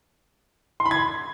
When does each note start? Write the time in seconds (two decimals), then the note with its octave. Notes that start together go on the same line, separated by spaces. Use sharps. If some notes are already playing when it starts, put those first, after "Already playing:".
0.80 C6
0.85 B5
0.91 G#6